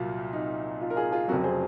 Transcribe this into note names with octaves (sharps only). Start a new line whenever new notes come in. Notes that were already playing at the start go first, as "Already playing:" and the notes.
Already playing: C2 A#2 F#3 A#3 F4
D#4
F4
A#4
F4 G#4
F4 G#4
F1 F2 C#3 F#3 F#4 A#4
G#4 C5